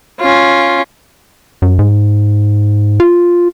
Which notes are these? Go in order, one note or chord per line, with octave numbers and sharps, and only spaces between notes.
C#4 F4
F#2
G#2
F4